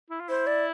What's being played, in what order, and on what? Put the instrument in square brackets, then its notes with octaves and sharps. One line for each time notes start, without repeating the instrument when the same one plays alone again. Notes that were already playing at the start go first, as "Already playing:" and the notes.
[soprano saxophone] E4
F4
[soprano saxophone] E4 [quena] C5
[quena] D5